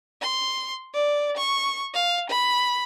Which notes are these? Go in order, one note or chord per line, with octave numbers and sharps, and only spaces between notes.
C6
D5
C#6
F5
B5